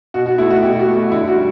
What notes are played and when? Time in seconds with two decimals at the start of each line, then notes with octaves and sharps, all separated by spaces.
0.14 B2 F#4
0.26 F#4
0.38 A3 E4
0.50 F#4
0.62 B2 G4
0.79 F#4
0.87 A3
1.12 D3 E4
1.28 F#4
1.36 G3